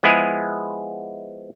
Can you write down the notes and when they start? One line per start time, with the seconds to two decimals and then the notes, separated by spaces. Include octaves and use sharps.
0.03 F3 G#3 B3 E4 G#4